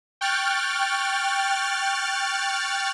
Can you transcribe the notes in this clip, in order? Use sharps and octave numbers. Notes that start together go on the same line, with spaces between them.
G5 C#6 F6 F#6 A6